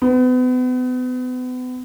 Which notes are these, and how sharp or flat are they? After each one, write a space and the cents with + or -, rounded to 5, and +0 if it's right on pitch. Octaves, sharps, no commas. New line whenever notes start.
B3 +35